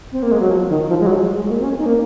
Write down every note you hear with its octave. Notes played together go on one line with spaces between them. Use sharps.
C4
A#3
G#3
F#3
F3
D#3
F3
G#3
F#3
G#3
G#3
A#3
C4
C#4
D#4
A#3